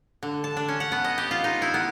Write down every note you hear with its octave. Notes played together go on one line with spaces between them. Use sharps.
D3
A5
D4
C#4
F#5
B3
D#5
G4
F4
D#4
E4
B3